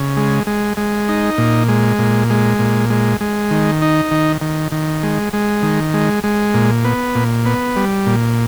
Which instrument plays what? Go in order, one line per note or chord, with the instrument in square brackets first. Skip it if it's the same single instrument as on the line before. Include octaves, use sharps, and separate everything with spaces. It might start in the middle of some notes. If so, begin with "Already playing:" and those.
Already playing: [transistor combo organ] C#3
G#3
G#3
G#3
D#4
A#2
G#3
A#2
G#3
A#2
G#3
G#3
D#3
D#4
D#3
D#3
D#3
G#3
G#3
D#3
G#3
G#3
A#2
B3
A#2
B3
G3
A#2